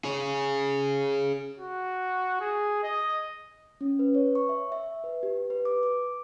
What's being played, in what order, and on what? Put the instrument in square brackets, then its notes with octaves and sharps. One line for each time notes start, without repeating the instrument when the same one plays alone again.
[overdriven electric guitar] G#4 C#5
[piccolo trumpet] F#4
G#4
D#5
[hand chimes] C#4
B4
C#5
C#6
E5
E5
B4
G4
B4
D6
D6